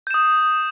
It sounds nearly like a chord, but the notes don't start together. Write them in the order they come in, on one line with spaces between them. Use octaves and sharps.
G6 E7 D#6